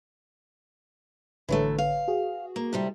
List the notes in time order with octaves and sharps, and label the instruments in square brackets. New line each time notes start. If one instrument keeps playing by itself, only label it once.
[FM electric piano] A1 D3 C#5 [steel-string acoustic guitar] E3 F#3 A3
[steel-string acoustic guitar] F5
[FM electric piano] F#4 G#4
[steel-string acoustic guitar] A#3
A2 C3 G3